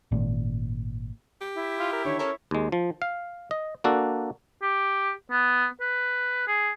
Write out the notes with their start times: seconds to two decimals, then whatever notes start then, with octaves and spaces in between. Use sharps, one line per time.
0.12 G#1 A#2
1.41 G4
1.55 E4
1.79 F4
1.93 A#4
2.05 D3 D#3 C#5
2.19 C#4 A4 A#4 C#5
2.51 D#2 G#3
2.72 F3
3.02 F5
3.51 D#5
3.84 A#3 D4 F#4 A4
4.62 G4
5.31 B3
5.81 B4
6.47 G#4